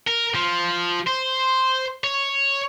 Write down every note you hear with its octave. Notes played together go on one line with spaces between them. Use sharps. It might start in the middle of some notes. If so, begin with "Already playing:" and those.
A#4
F3
C5
C#5